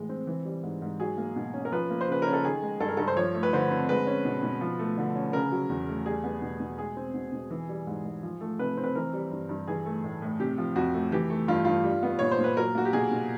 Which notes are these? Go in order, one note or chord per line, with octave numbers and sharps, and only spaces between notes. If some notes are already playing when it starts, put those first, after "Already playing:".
Already playing: A2 E3 G#3
C4
E3
G3
G#2
G#2
F#3 G#4
A#3
B2
C#4
A#4
F3 B4
A#3
C5
C#3 B4
C#4 A#4
A4
D#3 G#4
G#3
G2 A4
A#4
G2 A4
C5
F3 C#5
A3
B4
D3 C5
C4
G#3 B4
C#4
B2
B2
F3
A3
D3
C#4
C#3 A#4
F#3
E2
A3
G3 G#4
B3
B2
B2
G#3 G#4
C4
B2
B2
E3
G3
G#2
G#2
F3
A3
C3 B4
C4
B4
E3 A#4
G3
G2
G2
E3 G#4
A3
A2
A2
C3 G4
F3
F2 F#4
A3
E3 G4
A3
G2 F4
G2 F4
G3
B3
A#2 C#5
C5
A#2
B4
F#3 A#4
A#3 F#4
G4
B2 G#4
B2